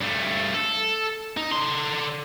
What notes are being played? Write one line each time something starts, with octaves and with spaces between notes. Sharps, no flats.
G2 A3
A4
D#4
D3 C6